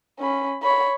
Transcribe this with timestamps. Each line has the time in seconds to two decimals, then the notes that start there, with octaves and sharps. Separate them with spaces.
0.20 C#4 B5
0.63 C#5 B5